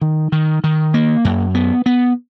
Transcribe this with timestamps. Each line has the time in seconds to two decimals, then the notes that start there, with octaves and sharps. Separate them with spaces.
0.01 D#3
0.32 D#3
0.64 D#3
0.94 A#3
1.25 F#2
1.55 B3
1.86 B3